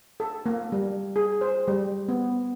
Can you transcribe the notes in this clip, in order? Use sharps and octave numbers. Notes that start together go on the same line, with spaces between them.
A4
A#3
G3
G#4
C5
G3
B3